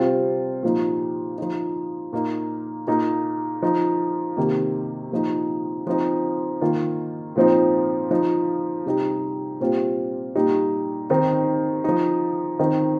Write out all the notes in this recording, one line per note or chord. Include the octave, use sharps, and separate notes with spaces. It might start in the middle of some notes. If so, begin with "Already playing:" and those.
Already playing: C3 G3 C4 F4
A#2 F3 D#4
F3 D#4
A#2 A#3 D#4
A#2 A#3 D#4
F3 D#4
C3 D#3 A#3
A#2 F3 D#4
F3 C4 D#4
D#3 A#3 F4
A#2 F3 C4 D#4
F3 D#4
C3 G3 D#4
A#2 G3 C4 F4
A#2 G3 D#4
D#3 C4 D#4
F3 D#4
D#3 C4 D#4